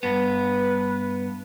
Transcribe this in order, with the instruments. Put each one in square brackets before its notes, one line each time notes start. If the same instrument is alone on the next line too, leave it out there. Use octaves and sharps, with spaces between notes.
[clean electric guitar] G2 B3 [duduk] B4